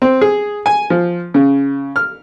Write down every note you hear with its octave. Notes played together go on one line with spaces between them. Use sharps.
C4
G#4
G#5
F3
C#3
F6